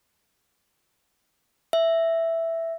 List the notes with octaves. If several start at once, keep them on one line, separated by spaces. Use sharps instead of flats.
E5